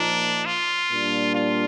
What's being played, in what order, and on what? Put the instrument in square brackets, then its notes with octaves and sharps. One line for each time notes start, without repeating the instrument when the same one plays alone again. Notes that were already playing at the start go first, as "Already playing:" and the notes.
Already playing: [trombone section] A#2 F3 A#3 D#4 A#4 [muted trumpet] D4
[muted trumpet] F4
[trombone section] A#2 G3 D4
[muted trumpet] F4